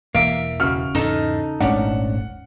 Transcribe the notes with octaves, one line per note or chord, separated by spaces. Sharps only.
E1 E3 A#3 E5 F5 D7
C#3 F#4 F6
E2 G#2 D#4 A4
D#1 G#1 G#2 A3 C#4 D4 F#5